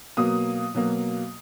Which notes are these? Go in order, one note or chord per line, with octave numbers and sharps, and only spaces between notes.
B2 F#3 A#3 D#6
B2 F#3 A#3